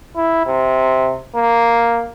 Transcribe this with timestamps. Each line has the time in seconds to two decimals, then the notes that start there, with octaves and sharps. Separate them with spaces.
0.16 E4
0.46 C3
1.36 A#3